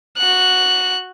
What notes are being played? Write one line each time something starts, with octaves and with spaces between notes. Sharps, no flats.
F#4 F#6